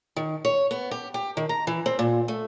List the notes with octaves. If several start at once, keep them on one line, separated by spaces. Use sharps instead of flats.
D#3
C#5
B3
G4
G4
D#3
A#5
E3
C4
A#2
A3